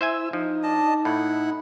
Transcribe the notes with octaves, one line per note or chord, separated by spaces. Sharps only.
E4 C5 E5 G#5 E6
F3 D#4
D4 D#5 A5
A2 E4 F#5